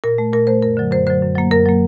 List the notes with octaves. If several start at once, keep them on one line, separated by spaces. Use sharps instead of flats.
A#2 A#4
A3
A#2 A#4
A3 C5
F#2 A#4
D3 F#3
F#2 C5
D3 F#3 C5
F#2
F#3 A#3
F#2 A#4
F#3 A#3